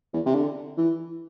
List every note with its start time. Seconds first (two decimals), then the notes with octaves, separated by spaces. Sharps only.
0.14 E2
0.26 C3
0.35 D3
0.77 E3